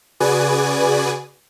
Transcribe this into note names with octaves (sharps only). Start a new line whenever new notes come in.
C#3 F#4 G#4 B4 D5 G#5